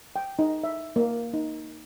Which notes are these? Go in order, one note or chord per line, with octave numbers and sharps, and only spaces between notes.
G5
D#4
E5
A#3
D#4